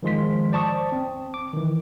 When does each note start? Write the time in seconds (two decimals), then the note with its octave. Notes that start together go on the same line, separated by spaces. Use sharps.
0.03 D#3 F3 G#3 C6 B6
0.52 C5 D5 A5 C#6 D#6
0.92 C4
1.34 D6
1.53 D#3 E3